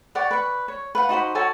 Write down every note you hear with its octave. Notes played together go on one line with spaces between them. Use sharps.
G4 C#5 D5 F#5
B4 C#6
C#5
B4 F5 F#5
D#4 F#4 C5 B5
F#4 A4 C#5 G#5